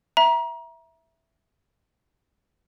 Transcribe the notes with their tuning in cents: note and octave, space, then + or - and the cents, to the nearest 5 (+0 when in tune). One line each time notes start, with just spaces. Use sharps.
E5 +0 A#5 +25